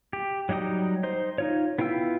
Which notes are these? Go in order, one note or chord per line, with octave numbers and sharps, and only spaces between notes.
G4
F#3 G3 D#4 G5 D#6
D#4 C5
D#4 F4 C#5
B3 E4 F4 G5 E6